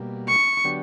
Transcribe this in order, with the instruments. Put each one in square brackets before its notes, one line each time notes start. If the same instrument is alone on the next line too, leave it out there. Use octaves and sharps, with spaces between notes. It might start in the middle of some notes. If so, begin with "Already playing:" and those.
Already playing: [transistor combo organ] B2 G3 A#3
[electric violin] C#6
[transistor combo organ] D3 F#3 B3 D4 G4